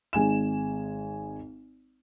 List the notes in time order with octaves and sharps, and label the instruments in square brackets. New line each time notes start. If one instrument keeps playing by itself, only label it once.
[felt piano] G#1 G#3 G#5 E7